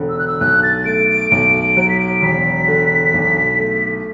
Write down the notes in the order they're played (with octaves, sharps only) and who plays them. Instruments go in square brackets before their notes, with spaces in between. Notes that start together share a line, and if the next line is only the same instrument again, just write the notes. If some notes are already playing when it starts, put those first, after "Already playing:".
Already playing: [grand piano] E1 D3
[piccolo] E6
F#6
E6
[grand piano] B1 [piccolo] F#6
[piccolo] A6
[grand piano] A3 [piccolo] D7
[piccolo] D7
[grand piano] B1 [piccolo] D7
[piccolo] D7
[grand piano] F#3 [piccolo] D7
[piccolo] B6
D7
[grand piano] E1 [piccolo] B6
[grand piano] D3
B1
A3